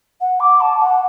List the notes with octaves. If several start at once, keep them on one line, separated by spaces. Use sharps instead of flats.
F#5
D6
A5
F#5